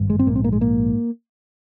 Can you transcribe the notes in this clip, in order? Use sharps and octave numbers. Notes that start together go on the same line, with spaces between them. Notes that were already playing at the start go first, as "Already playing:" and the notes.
Already playing: G#1 G2
G#3
C4
A#1 G#2 A#3
C4
A#3
G#3
A#3